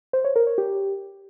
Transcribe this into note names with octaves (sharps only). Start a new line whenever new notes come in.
C5
C#5
A#4
C#5
G4